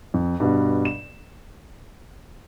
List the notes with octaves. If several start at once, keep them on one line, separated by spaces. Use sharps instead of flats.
F2
G2 B2
E7